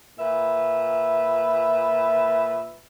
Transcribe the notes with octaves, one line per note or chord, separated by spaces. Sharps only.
A#2 B4 E5